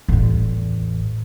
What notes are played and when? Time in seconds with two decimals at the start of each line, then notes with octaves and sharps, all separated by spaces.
0.09 A1 E2